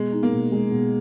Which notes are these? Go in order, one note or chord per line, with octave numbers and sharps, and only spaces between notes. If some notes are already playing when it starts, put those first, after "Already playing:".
Already playing: B2 G#3
D#4
A#3
B2
G#3
B2